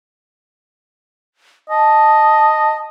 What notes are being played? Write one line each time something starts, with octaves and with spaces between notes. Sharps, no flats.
D#5 A5